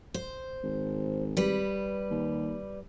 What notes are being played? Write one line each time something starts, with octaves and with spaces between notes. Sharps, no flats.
C5
G#1
G3 B4
D#2